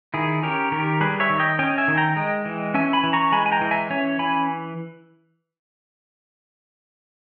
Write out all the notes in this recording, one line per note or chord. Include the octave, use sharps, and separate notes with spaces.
D#3 E4 G#4
C#4 G4 A#4
D#3 G4 A#4
G3 G#4 B4
C#5 E5
D#3
D#5 G5
C#4 D#5 G5
E5 G#5
D#3
G5 A#5
G#3 D#5 G5
E3
C#4 E5 G#5
G#5 B5
E3
A#5 C#6
G#3 G#5 B5
G#5
G5 A#5
E3
E5 G#5
C#4 C#5 E5
E3 G#5 B5